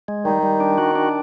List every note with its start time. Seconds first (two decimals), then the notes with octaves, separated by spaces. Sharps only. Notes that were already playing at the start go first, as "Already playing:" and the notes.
0.08 G#3
0.25 D#3 G3
0.43 G3
0.60 D4
0.78 F#4
0.95 D4